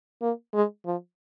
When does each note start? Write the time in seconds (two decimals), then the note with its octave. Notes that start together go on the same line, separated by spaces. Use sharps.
0.22 A#3
0.54 G#3
0.85 F3